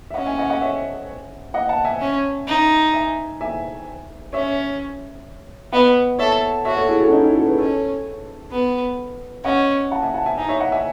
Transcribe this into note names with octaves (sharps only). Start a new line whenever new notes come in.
E5
C#4 D#5 F#5
E5 G#5
D#5 F#5
D#5 F#5
C#5 E5
D#5 F#5
F#5 A5
E5 G#5
C#4
D#4
E5 G#5
E5 G#5
C#4 C#5 E5
B3 D#5 F#5
A4 C#5 E5
F#4 C#5 E5
A4 C#5
E4 G#4
F#4 A4
C#4
D#4
C#4 E4
F#4 A4
G#4 B4
C#4 A4 C#5
B3
C#4 D#5 F#5
F#5 A5
E5 G#5
F#5 A5
E5 G#5
D#4 E5 G#5
C#5 E5
D#5 F#5
E5 G#5